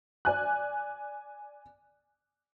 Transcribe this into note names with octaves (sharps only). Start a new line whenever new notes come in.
D5 G#5 F#6